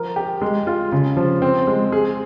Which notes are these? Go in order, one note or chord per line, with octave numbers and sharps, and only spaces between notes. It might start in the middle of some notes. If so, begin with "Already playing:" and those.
Already playing: F3 A#4
G4
G#3
F4
C#3
F3
C4
G#3
G#4